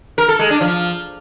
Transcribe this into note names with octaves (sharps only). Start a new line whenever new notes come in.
A#4
A4
G#3
D4
F3